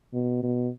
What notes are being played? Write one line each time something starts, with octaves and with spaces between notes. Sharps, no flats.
B2
B2